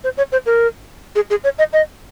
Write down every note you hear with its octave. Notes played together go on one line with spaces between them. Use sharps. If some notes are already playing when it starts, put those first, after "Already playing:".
C5
C#5
C5
A#4
G#4
G#4
C#5
D#5
D#5